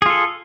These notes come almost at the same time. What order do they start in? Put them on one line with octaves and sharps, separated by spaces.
G#4 F4 A4